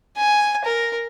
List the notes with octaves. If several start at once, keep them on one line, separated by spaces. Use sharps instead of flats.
G#5
A#4